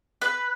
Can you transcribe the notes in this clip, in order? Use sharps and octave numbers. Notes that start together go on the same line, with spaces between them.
B4